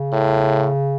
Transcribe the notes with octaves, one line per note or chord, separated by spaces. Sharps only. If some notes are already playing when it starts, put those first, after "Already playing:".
Already playing: C#3
A2